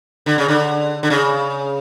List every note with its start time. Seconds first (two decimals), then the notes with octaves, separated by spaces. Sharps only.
0.26 D3
0.38 C#3
0.48 D3
1.03 D3
1.10 C#3